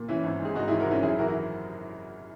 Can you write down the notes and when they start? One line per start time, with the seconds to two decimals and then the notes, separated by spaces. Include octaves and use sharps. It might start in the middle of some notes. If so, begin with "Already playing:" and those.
Already playing: A#2
0.08 E3 C#4 E4
0.24 G#1
0.40 G#2 G#4
0.55 G#2 D#4 F#4
0.68 E4 G#4
0.71 G#1
0.80 F#4 A#4
0.87 G#1 C#4 E4
1.03 F#2 E4 G#4
1.19 E3 F#4 A#4
1.28 E4